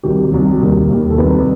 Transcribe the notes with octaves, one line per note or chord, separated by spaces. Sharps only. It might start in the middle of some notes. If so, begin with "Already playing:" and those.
C2 C3 D#3 F#3 G4
C2 C3 D#3 F#3
D#2 D#3 G3
D#2 D#3 G3
A4
C2 C3 D#3 G3 B4